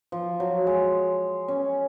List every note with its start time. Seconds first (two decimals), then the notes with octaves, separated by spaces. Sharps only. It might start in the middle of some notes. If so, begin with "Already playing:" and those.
0.12 F3
0.40 F#3
0.67 G#3
1.48 C#4